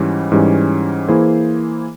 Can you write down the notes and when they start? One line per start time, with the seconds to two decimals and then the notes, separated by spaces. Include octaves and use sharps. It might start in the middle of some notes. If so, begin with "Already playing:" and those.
Already playing: G#2 E3 G3 C#4
0.32 G#2 E3 G3 C#4
1.08 E3 A#3 E4 G#4 C5